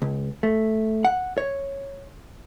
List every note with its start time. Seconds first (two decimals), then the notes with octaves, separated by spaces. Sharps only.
0.02 C#2
0.43 A3
1.05 F#5
1.38 C#5